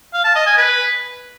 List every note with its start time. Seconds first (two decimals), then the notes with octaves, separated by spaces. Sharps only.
0.13 F5
0.24 A5
0.35 D#5
0.46 G#5
0.58 B4